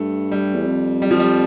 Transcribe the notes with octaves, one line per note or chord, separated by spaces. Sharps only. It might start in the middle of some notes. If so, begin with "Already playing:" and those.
Already playing: G2 A3
G3
E2
F2
G3
F3
G3